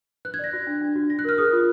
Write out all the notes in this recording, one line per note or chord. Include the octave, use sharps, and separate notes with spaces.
B4 F#6
G#6
D5 A#6
F#4
D4
D4
F#4
F#4 A#6
F#6
A#4 F6
G#4 D#6
F4